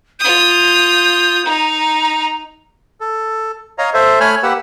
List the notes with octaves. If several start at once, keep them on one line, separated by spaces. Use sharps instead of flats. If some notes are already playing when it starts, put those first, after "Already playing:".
F4 D#6 G6
D#4 A#5
A4
C#5 D#5 F5 A#5
A4 C5 E5
A3 C#5 G#5 B5 F6
A#3 G4 B4 F#5 E6